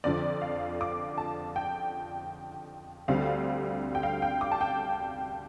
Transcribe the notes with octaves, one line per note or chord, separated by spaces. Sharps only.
F2 D3 F3 D5
F5
D6
A5
G5
D2 D3 G3 C4 F5
G5
F5
G5
D6
A5
G5